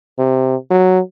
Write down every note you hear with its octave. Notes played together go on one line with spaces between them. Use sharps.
C3
F#3